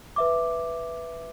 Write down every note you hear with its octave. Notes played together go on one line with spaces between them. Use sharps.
B4 E5 D6